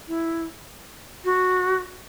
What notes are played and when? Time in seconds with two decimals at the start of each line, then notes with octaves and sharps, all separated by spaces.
0.08 E4
1.25 F#4